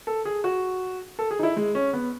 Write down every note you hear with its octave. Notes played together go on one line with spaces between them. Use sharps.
A4
G#4
F#4
A4
G#4
D#4
E4
G#3
C#4
B3